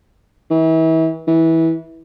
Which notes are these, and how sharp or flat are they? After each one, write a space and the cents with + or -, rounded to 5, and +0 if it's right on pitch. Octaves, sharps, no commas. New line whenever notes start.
E3 -35
E3 -20